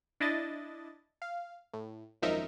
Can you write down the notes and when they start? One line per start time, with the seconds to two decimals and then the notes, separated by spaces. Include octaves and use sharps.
0.20 D4 E4 D#5 A6
1.22 F5
1.73 A2
2.22 G#1 F#2 F3 D#4 A#4 E5